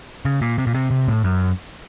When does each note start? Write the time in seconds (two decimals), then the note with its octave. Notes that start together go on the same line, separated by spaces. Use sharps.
0.25 C#3
0.42 A#2
0.58 C3
0.67 A#2
0.75 C3
0.91 C3
1.08 A2
1.24 F#2